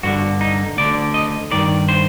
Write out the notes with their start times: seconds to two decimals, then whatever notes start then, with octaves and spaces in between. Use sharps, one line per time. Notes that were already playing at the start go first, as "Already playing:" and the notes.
0.03 G2 D3 F#4
0.41 D#4
0.77 D2 D3 D5
1.14 D#5
1.51 G2 D#3 D5
1.89 C5